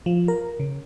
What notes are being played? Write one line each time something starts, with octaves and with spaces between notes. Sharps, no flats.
F3
A#4
C#3